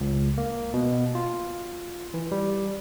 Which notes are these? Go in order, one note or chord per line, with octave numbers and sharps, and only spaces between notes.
C#2
A#3
B2
F4
E3
G3